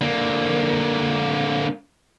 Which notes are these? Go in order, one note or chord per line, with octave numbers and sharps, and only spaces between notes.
D3 A#3